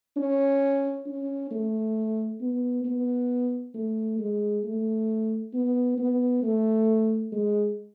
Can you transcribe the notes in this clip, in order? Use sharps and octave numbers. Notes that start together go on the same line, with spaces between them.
C#4
C#4
A3
B3
B3
A3
G#3
A3
B3
B3
A3
G#3